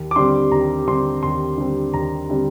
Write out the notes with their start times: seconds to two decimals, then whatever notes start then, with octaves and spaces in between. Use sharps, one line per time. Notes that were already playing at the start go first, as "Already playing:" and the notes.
Already playing: D#2
0.11 D6
0.16 D3 G3 C4 C6
0.51 D#2 A#5
0.87 D3 G3 C4 C6
1.23 D#2 C6
1.58 D3 G3 C4
1.94 D#2 A#5
2.29 D3 G3 C4